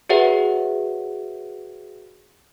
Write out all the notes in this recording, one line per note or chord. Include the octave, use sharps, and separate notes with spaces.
F#4 G#4 B4 C#5 E5 F#5